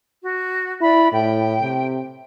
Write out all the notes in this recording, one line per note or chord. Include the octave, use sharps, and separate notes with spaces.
F#4
E4 D5 B5
A2 G5
C3